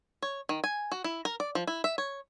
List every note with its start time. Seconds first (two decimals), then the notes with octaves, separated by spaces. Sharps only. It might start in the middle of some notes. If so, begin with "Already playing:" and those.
0.22 C#5
0.49 D#3
0.64 G#5
0.92 F#4
1.04 E4
1.25 A#4
1.40 D5
1.55 F3
1.67 E4
1.84 E5
1.98 C#5